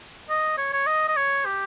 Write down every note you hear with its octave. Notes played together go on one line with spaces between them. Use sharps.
D#5
C#5
C#5
D#5
D#5
C#5
G4